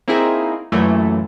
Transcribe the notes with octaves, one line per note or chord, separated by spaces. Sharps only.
A#3 C4 D#4 E4 G#4
F#2 A#2 E3 A3